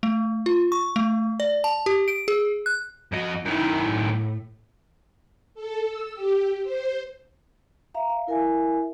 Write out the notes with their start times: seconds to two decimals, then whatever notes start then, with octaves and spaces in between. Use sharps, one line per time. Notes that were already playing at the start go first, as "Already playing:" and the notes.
0.03 A3
0.46 F4
0.72 C#6
0.96 A3
1.40 D5
1.64 A5
1.86 G4
2.08 D7
2.28 G#4
2.66 F#6
3.13 F2 F#4 D#5
3.45 F#2 D#3 D#4 E4
3.83 A2
5.55 A4
5.86 E6
6.15 G4
6.63 C5
7.94 E5 F5 A#5
8.10 F5
8.27 E4 A#4 E5 G#5